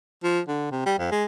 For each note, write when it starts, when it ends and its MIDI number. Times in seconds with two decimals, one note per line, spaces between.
0.23 0.40 53
0.48 0.67 50
0.71 0.84 48
0.86 0.94 55
0.99 1.09 41
1.12 1.25 56